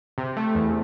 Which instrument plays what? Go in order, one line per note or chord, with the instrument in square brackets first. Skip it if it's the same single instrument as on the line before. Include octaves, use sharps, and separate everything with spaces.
[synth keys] C3
A3
E2